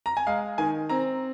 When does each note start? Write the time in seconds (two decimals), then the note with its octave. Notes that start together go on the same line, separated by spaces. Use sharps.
0.06 A#5
0.17 G#5
0.27 G#3 F5
0.58 D#3 G#5
0.89 C4 A#5